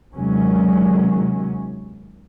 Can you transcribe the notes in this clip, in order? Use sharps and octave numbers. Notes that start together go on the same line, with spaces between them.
D#2 C3 D#3 F#3 G#3 C#4